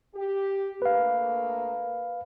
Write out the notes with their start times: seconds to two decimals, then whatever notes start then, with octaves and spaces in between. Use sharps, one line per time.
0.15 G4
0.82 D2 A#3 B4 F5